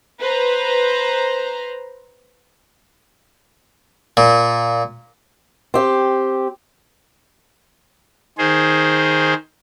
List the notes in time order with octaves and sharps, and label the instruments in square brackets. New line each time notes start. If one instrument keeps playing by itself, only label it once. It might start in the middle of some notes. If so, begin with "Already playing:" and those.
[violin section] B4 C5 A#5
[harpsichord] A#2
[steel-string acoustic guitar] C4 G4
[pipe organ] D#3 G#4 C5